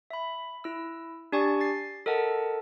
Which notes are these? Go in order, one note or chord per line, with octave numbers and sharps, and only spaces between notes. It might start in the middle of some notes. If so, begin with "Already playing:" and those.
E5 B5
E4 E6
D4 G4 D5 G#5 C#6 A6
A6 C7
A4 A#4 D#5 F#5 A5